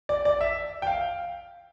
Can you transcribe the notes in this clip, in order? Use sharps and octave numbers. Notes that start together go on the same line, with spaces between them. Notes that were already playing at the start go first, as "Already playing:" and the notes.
D5
D5
E5
G5
F5